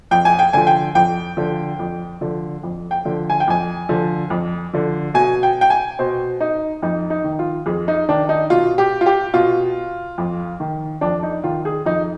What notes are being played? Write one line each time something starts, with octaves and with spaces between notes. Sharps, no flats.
F2 G5
G#5
G5
D3 F3 G#5
G5
F2 G5
D3 F3
F2
D3 F3
F2
G5
D3 F3
G#5
G5
F2 G#5
D3 F3
F2
D3 F3
B2 G#5
G5
G5
G#5
B2 C5
D#4
F2 D#4
D#4
D#3
F4
F2 G#4
D#4
D#3 D4
D#4
B2 F4
G4
F4
G4
B2 F4
F2
D#3
F2 D4
D#4
D#3 F4
G#4
F2 D#4